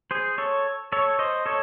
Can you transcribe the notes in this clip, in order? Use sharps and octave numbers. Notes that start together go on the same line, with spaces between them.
G#4 C5
A4 C#5
A4 C#5
C5 D#5
A4 C#5